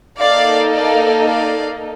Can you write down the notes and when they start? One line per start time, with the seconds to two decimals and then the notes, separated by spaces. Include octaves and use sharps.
0.20 A#3 D#4 A4 D5 F5
0.73 D5 F5
1.25 D5 F5